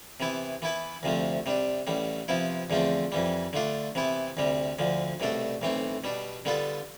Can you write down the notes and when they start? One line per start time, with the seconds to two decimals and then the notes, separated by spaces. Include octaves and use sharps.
0.20 C3 E3 B3 E4
0.62 E3 B3 E4 B4
1.03 D2 C3 F3 A3
1.46 C3 G3 D4
1.87 A1 A2 G3
2.28 C3 F3 B3 E4
2.70 E2 D3 F3 A3 C4
3.12 F2 E3 G3
3.53 D3 A3 D4 F4
3.95 C3 E3 B3 E4
4.37 D2 C3 G3
4.79 D2 D3 F3
5.20 C2 B2 A3 D4 A4
5.61 B1 A2 E3 A3 C4
6.04 B2 G3 D4
6.45 D3 G3 B3 F4 A4